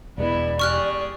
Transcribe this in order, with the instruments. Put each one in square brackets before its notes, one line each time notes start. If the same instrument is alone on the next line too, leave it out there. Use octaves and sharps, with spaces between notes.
[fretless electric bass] E1 G#3 [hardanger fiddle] B3 E4 [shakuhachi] D5
[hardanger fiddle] G4 G#4 [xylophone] C#6 F6 F#6